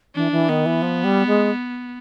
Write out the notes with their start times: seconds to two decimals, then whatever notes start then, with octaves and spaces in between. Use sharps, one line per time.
0.15 E3 D4
0.31 E3
0.49 D#3 B3
0.65 E3
0.82 F3
1.04 G3
1.26 G#3